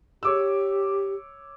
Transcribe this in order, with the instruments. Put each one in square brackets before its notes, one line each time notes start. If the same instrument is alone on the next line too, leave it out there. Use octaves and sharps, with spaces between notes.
[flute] G4 [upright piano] C#5 D6 E6